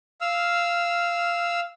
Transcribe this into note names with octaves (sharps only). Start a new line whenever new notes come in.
F5 E6 F6